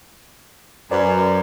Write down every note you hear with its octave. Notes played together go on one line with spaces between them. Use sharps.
F#2 B4 C5 D5